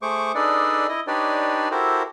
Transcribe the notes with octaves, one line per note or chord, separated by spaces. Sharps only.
A3 G#4 C5 C#6 D6
D4 D#4 G#4 A4 B4 D5
E4 D#5
D4 D#4 G4 B4 C#5 D5
E4 F#4 G4 A4 A#4 C5